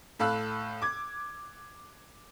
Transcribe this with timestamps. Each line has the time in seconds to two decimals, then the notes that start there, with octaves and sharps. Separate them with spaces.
0.19 A2 A4 F5 B5 E6 F#6
0.82 D6 G#6